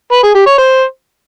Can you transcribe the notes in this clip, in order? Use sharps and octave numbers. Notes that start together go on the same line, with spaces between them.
B4
G#4
G4
C#5
C5